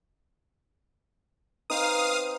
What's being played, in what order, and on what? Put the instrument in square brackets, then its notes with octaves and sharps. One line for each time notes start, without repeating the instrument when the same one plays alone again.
[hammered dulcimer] C4 D#4 B4 [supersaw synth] F5 D#6